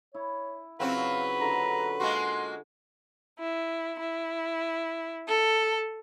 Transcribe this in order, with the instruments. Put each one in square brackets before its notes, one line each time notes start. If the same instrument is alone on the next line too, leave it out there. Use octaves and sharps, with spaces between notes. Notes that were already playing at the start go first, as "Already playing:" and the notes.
[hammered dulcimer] E4 [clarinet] C#5
[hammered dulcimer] C#3 E4 F4 [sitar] F#3 C4 [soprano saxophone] B4 [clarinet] F5
[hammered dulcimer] D3 F4 [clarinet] A#5
[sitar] G#3 A#3 F#4 [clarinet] C6
[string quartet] E4
E4
A4